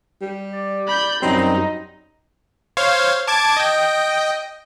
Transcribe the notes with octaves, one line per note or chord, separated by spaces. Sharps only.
G3
D5
B5 G6
F#2 F#3 G3 C4 D#4 D#5
C5 C#5 F5
A5 D6 G#6
D#5 G5